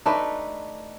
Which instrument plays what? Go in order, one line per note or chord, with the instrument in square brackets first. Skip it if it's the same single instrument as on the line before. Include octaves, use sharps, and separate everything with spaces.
[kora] A3 D4 D#4 B4